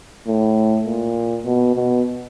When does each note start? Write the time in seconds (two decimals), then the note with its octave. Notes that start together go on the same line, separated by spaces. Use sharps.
0.27 A2
0.86 A#2
1.46 B2
1.75 B2